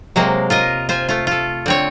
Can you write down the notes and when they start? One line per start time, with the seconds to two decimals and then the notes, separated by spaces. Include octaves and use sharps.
0.16 C3 F#3 G#3 A#3
0.50 F4 A#4 D#5
0.89 F4 C5 G#5
1.09 A3 F4
1.27 F4 A4
1.66 D3 C4 C#5